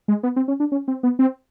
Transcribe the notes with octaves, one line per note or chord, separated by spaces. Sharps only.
G#3
B3
C4
C#4
D4
C#4
C4
B3
C4